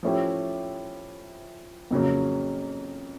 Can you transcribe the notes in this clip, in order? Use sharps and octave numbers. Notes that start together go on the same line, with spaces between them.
F3 A3 C#4 E4 G4
F2 C#3 F#3 A#3 C#4